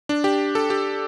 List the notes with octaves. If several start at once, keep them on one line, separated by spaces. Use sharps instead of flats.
D4
G4
A4
G4